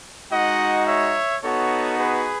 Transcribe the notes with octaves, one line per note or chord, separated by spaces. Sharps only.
G#3 D#4 F#4 D#5 F#5
C#5 E5
B3 D#4 F#4 A4 C#5
G#4 B4